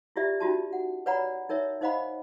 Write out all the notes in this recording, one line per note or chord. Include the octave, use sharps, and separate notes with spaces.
E4 F4 G4 D5 E5
C#4 D#4 F4 F#4 A5
F#5
B4 C#5 D5 F#5 A#5 B5
D#4 A#4 C#5 E5
D#4 C5 D#5 F5 F#5 B5